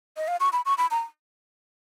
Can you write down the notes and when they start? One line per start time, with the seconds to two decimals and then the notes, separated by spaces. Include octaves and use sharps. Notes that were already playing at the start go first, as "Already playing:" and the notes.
0.17 D#5
0.28 F5
0.40 C#6
0.53 B5
0.65 C#6
0.78 B5
0.91 A#5